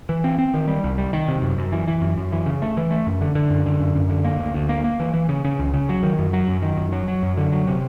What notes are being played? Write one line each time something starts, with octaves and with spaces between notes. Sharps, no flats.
E3
C4
C4
D#3
G3
C2
G3
D#3
C3
F#2
F#2
E3
E3
F#2
F#2
E3
C#3
A3
E3
A3
F#2
D3
D3
F#2
D3
F#2
F#2
D3
A#3
D2
D2
A#3
A#3
E3
E3
C#3
C#3
C#2
C#3
F#3
D#3
F#2
F#3
F#2
D#3
F#2
F#3
F#3
F#2
D3
F#3
C3